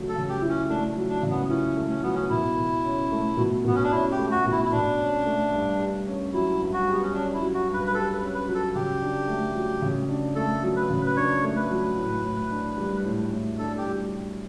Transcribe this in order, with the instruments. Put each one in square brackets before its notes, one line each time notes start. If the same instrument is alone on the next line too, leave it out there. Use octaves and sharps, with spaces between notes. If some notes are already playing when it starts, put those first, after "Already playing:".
Already playing: [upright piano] C#3 F#3 A3
[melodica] A4
[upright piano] C#3
[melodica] G4
[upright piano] E4
[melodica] C#4
[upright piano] A3 [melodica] D4
[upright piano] F#3
[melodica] D4
[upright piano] C#3
[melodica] B3
[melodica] C#4 [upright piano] E4
[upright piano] A3
[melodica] C#4
[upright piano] F#3 [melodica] B3
[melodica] C#4
[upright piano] B2 [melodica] E4
[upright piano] B2
C#4
A3
B2
[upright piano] B2 [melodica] B3
[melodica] C#4
D4
[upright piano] C#4 [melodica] E4
[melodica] G4
[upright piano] A3
[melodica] F#4
[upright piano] B2
[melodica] E4
E4
[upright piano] B2 [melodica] D4
[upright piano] C#4
A3
G2
G4
C#4
[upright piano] F#3 [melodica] E4
[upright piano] G2
[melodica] F#4
[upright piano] G4
[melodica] B3
C#4
[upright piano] C#4 [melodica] D4
[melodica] E4
[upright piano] F#3
[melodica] F#4
[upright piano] G2
[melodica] B4
B4
[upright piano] G4 [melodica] A4
[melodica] B4
[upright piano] C#4
[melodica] B4
[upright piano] F#3
[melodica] A4
[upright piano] C#3 [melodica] G4
[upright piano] D4
A3
F#3
C#3
D4
[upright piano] A3 [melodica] A4
[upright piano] F#3
[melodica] B4
[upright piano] C#3
[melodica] B4
[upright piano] D4 [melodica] C#5
[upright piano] A3
[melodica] B4
[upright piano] F#3
A2
A2
D4
G3
A2
A2
[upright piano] D4 [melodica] A4
[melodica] G4
[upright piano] G3